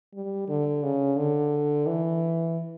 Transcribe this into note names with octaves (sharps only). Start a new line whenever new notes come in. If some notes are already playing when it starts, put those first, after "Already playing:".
G3
D3
C#3
D3
E3